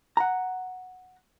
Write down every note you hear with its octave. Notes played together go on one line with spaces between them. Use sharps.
F#5 A#5